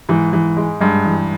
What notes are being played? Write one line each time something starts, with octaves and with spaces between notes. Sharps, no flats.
G#2 E3
E3
G#3
G2 G#3
E3